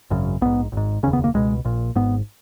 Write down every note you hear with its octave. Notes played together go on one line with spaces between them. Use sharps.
G#1 F#2 C#3
A#1 G#2 B3
G#1 G#2
F1 D#2 C#3 C#4
B3
A#3
C#2 B2 G#3
A#1 A#2
G#1 G#2 B3